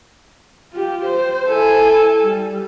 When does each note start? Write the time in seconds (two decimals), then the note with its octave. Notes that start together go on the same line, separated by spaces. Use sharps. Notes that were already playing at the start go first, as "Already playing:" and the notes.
0.73 F4 G4
1.05 C5
1.48 E4 A4 G#5
2.21 G3